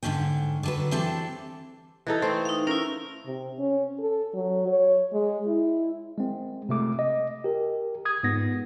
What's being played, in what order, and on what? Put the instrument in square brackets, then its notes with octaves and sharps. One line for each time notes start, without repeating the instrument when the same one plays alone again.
[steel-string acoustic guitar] G#2 D3 G#3 C#4 G5
D3 F#3 B4
E3 C4 D4 G4 A4
[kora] E3 D#4 A4
A3 C4 C5
[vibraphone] D#4 F5
[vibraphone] C#4 E4 [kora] A#4
[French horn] C3
C#4
A4
F#3
C#5
G#3
E4
[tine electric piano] G#3 C4
C3 A3 D6
D#5
G4 A#4
D#6 G#6
G#2 B3 A#6